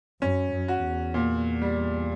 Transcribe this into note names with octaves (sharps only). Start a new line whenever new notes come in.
F#2 C#4
F#2
F#4
E2
A#2
G3